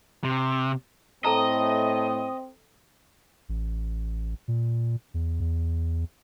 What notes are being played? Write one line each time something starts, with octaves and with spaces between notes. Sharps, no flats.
C3
A2 C4 A4 D#5 A5 A#5
A1
A#2
E2
E2